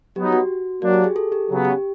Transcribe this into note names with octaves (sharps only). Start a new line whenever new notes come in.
F#3 B3 D#4 G4
F#4
F#3 A#3 D4 F#4
G4
G#4
A4
G4
C#3 F#3 B3
G4